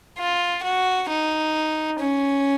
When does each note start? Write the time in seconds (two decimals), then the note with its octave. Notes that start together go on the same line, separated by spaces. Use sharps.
0.18 F4
0.63 F#4
1.09 D#4
1.99 C#4